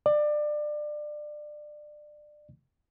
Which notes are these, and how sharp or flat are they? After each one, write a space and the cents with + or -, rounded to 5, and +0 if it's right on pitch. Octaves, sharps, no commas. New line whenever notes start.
D5 +25